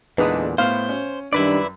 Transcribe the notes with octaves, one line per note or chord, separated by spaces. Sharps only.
E2 A#2 D3 G#3 D4 D#4 B4 D#6
A2 B3 C5 F5
C#4
F#2 D#3 G3 D4 E4 B4 D5